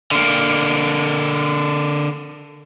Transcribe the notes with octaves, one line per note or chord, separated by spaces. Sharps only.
D3 A#3